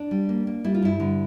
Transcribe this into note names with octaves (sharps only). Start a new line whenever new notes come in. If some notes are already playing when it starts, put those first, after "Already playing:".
Already playing: D4
G3
A#3
A#3
G3 E4
F4
G2 E4
D3